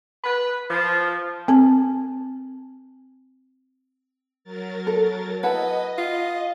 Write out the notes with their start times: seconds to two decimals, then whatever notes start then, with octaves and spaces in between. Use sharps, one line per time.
0.24 B4
0.69 F3
1.48 C4 A5
4.44 F#3 A#4 A6
4.87 A4
5.43 E4 B4 D#5 F#5 A5
5.98 F4